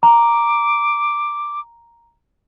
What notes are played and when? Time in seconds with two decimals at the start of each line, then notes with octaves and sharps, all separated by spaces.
0.03 A#5 D6